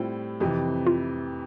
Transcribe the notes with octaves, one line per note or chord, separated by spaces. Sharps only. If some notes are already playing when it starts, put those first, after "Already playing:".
Already playing: A2 G3 C4 E4 F4
F2 C3 E3 G4
F4